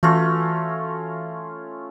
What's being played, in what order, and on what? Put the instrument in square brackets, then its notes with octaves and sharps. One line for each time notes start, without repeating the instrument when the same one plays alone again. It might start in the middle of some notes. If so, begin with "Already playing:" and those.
[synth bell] E3 F#4 A#6 [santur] A3 C#4 F4